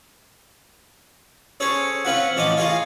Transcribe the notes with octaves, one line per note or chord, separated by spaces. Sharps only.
C#4 G#4 A4 C5 C#5
C4 C#4 F4 B4 F#5
A1 F3 C#5 D#5 A5 D6
F4 G#4 A#4 C#5 F5